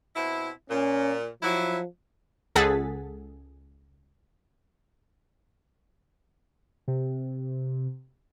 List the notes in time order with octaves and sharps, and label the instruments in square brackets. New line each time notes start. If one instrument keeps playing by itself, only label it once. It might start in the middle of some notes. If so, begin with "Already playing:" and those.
[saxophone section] B2 C4 E4
[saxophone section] A#2 [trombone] C#4
[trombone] F3 [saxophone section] F#3 E4
[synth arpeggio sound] C#2 G#4 A4 F#5 A6 B6
[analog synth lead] C3